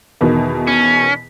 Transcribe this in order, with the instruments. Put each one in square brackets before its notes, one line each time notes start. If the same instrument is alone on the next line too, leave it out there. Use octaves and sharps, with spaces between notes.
[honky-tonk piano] E2 B2 D#3
[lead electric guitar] C#4